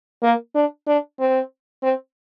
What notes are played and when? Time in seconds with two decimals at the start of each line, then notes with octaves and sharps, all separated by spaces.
0.23 A#3
0.55 D4
0.87 D4
1.20 C4
1.83 C4